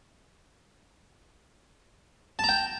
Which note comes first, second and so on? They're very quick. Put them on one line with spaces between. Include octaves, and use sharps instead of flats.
A5 A#5 G5